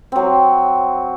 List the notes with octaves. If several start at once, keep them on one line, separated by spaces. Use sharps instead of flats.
F#3 C4